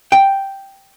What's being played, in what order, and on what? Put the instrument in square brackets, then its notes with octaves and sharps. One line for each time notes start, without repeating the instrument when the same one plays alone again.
[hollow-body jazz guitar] G5